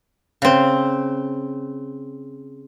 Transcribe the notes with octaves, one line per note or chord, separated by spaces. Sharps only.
C#3 C4